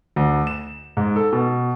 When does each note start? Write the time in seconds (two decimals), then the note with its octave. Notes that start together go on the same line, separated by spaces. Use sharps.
0.16 D2
0.47 E7
0.97 G#2
1.16 A4
1.33 B2